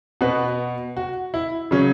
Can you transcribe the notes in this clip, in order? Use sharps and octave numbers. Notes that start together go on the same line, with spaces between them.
B2 B3 F#4 B4
F#4
E4
C#3 F#3 C#4